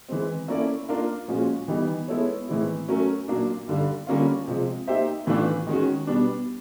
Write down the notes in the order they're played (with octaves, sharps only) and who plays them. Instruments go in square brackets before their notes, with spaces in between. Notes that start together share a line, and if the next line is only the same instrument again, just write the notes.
[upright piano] E3 G#3 C4
A#3 C#4 E4 A4 D5
A#3 D4 F4 A#4
A#2 F3 G#3 C#4 F#4
E3 G3 B3 D#4 G4
G#3 B3 E4 A4 C#5
A2 E3 G#3 C4 E4
F#3 A3 C#4 F#4 A#4
A#2 F#3 A#3 D4
G2 D3 G3
D3 G3 A#3 C#4 F4
C3 F3 G#3
A#3 D#4 G4 C5 E5
A2 E3 A3 D4 F4
D#3 G#3 C#4 F#4
B2 G3 B3 D4